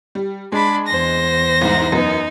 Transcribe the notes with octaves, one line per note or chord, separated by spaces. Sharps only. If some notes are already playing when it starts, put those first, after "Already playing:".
G3
G#3 D4 B5
E2 C5 A#6
C2 G#2
F#2 B3 D#4